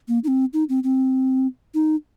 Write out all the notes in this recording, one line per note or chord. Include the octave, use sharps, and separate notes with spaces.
A#3
D#4
C4
D#4
C4
C4
D#4